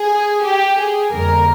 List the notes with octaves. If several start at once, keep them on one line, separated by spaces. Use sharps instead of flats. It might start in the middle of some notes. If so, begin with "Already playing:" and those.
Already playing: G#4
G4
G#4
F2 D3 G3 A#3 A#4